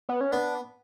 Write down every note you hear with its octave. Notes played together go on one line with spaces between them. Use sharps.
B3
C#4
B3 D4